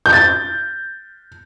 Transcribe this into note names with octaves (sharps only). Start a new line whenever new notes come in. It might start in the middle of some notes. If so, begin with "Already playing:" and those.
G6
A6